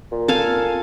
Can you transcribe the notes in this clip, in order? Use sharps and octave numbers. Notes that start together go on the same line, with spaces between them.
A#2
A4 F5 G#5